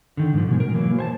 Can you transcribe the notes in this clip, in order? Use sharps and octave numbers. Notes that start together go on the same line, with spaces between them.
D3 D#3
G#2 F3
B2 G#3
A#4
E3 F#3 A#3
C5 G#5 A5